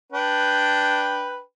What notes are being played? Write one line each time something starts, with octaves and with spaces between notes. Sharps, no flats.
D4 B4 G5